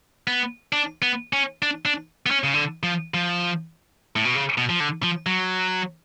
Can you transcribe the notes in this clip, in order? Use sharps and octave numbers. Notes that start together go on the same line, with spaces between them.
B3
D4
B3
C#4
D4
D4
B3
C#4
C#3
D3
F3
F3
A2
B2
C#3
B2
F3
D3
F3
F#3